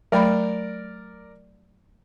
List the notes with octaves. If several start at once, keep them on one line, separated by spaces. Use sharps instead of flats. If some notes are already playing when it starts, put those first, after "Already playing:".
F#3 A3 A#4 D5 B5